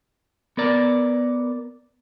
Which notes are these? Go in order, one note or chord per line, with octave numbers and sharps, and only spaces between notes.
B3 A#4 D5